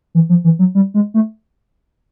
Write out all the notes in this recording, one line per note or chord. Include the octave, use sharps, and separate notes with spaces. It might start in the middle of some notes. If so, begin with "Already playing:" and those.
E3
F3
E3
F#3
G3
G#3
A3